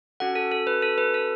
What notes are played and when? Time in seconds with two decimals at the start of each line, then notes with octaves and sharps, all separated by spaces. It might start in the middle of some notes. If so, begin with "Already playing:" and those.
0.20 C#4 F#4 A4 F#5
0.36 A4
0.51 A4
0.67 B4
0.82 A4
0.98 B4
1.14 A4